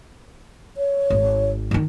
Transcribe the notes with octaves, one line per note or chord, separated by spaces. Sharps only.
C#5
G#1
D#3 E3